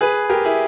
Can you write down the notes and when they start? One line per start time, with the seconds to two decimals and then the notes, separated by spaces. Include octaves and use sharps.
0.01 G#4 B4
0.29 G4 A#4
0.45 E4 G#4